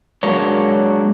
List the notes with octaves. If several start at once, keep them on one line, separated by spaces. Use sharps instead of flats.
F#3 G#3 A#3 D4 A#4 C#5